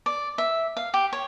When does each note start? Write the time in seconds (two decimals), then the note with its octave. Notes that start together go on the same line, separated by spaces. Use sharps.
0.06 D5
0.38 E5
0.77 F5
0.94 G4
1.13 C#5